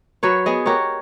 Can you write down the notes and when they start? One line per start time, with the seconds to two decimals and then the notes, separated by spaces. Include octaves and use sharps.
0.23 F#3 B4 C#5
0.46 B3 G#4 D#5
0.66 F#4 G4 A#4 C#5